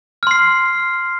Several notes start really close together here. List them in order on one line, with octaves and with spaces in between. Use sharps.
F6 C6 C7